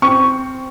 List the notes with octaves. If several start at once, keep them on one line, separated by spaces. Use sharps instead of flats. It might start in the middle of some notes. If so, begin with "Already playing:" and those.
C4 C#6